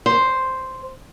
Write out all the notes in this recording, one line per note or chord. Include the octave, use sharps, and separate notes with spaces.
C5